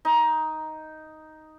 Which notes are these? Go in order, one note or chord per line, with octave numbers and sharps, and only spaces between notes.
D#4